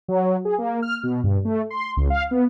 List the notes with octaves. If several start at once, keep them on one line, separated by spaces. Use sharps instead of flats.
F#3
G#4
A#3
F6
B2
G2
A3
C6
C#2
F5
B3